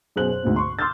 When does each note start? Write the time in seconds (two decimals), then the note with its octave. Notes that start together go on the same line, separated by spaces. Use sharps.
0.16 F#2 B2 G#4 C5 F#6 F#7
0.31 C5
0.43 D2 G#2 B2
0.56 C6 C#6
0.79 C6 D6 E6 F6 G6 A6